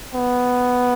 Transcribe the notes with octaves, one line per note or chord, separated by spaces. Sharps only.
B3